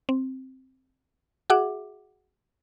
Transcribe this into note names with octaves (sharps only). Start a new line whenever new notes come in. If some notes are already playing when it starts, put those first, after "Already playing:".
C4
F#4 G#4 E5 F#5 D6